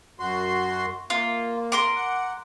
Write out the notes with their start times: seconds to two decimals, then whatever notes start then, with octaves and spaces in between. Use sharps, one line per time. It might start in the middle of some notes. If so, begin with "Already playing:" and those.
0.20 F#2 F#4 C6
1.10 A#3 F4
1.72 A#4 C6 D6
1.96 F#5